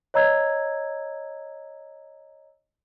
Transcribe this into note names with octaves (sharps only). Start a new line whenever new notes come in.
C#5 D#5 A#5 E6 G#6